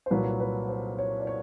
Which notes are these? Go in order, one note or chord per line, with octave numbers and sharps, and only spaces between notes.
C5
C2 A#2 F#3 B4
B4
C5
C#5
D5
C#5